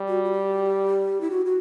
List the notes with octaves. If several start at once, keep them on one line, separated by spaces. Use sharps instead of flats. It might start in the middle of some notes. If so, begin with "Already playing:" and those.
Already playing: G3
F#4
F#4
G4
E4
F#4
F#4